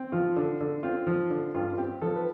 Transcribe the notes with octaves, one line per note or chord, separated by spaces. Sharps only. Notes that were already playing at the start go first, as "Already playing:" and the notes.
Already playing: C4
F3 F4
D3
D3
C4 F4
F3
D3
G2 F4
F4
C4 G4
F3 A4
B4